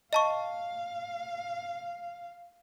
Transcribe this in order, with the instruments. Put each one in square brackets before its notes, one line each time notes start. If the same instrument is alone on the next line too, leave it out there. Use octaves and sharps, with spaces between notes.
[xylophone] D#5 A5 C#6 [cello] F5